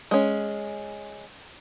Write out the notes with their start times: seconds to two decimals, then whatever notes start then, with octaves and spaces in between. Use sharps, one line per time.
0.11 G#3 C#4